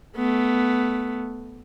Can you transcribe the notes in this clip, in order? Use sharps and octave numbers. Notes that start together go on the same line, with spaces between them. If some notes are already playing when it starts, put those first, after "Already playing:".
A3 B3